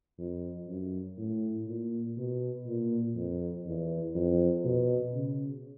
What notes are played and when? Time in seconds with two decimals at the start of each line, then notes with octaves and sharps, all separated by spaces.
0.18 F2
0.68 F#2
1.18 A2
1.67 A#2
2.17 B2
2.66 A#2
3.16 F2
3.66 E2
4.15 F2
4.65 B2
5.14 C#3